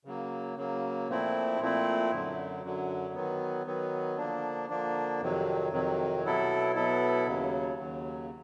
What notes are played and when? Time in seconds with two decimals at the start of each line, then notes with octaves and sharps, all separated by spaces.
0.05 C#3 F#3 A#3
0.57 C#3 F#3 A#3
1.09 A#2 F3 A3 C4 E4
1.60 A#2 F3 A3 C4 E4
2.11 F#2 D3 F#3
2.63 F#2 D3 F#3
3.14 D#3 F#3 B3
3.66 D#3 F#3 B3
4.17 D3 F3 A#3 D4
4.69 D3 F3 A#3 D4
5.21 F2 C3 D#3 F#3
5.72 F2 C3 D#3 F#3
6.24 B2 F#3 B3 E4 A4
6.76 B2 F#3 B3 E4 A4
7.27 D#2 C#3 F#3
7.79 D#2 C#3 F#3